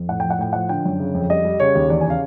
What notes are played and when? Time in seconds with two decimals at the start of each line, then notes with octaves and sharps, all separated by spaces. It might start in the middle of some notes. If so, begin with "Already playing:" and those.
Already playing: F2
0.09 A2 F#5
0.20 F3 G5
0.30 F#5
0.39 A2 G5
0.53 F3 F#5
0.69 D3 G5
0.85 F#2
1.00 C#3
1.14 F2
1.30 G3 D#5
1.45 G3
1.60 C#3 C#5
1.75 D#2
1.90 E2 D5
2.01 G#5
2.06 C#3 F5